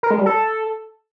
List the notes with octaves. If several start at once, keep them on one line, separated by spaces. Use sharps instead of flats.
A#4
G#3
G3
A4